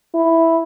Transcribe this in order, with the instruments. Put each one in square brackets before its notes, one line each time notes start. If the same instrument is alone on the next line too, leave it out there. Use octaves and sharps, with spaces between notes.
[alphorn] E4